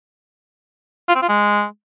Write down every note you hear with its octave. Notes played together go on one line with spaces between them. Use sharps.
F4
C4
F4
G#3